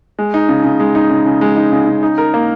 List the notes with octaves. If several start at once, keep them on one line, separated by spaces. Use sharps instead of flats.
G#3
D#4
C#3
C#3
G#3
D#4
C#3
C#3
G#3
D#4
C#3
C#3
D#4
A#4
A#3